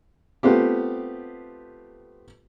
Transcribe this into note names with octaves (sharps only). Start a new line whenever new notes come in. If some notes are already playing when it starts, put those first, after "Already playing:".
A3 B3 C4 F4 G4